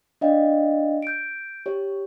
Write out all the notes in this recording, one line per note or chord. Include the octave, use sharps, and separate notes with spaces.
D4 D5 D#5 F5 G5
G6 D7
G4 C#5